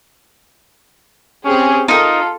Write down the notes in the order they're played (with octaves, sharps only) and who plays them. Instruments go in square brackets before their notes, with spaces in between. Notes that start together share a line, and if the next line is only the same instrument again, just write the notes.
[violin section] C4 G4 G#4 [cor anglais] C#4
[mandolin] D#4 A#4 [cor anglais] F4 [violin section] A4